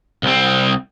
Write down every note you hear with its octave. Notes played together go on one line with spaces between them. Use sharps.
C2 C4